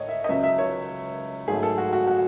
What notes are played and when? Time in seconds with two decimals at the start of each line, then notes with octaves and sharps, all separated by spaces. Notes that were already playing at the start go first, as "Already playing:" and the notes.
Already playing: A2 C#5 D#5
0.09 E5
0.24 D#5
0.28 C#2 C#3 F#3 E5
0.43 E5
0.58 C#5
1.48 G#2 F#3 A3 G#4
1.63 A4
1.78 F#4
1.93 F#4
2.07 F#4